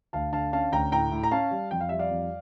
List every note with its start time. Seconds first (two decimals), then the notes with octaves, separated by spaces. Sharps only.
0.13 D2 F5 A5
0.32 D3 F5 A5
0.52 C#4 F5 A5
0.72 D2 G5 A#5
0.92 A2 G5 A#5
1.11 A2
1.23 A#5
1.31 C#4 F5 A5
1.51 G3
1.71 F2 G5
1.81 F5
1.89 G3 E5
1.99 D5 F5
2.10 F2